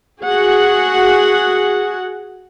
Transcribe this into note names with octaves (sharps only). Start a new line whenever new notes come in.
F#4 G#4 F#5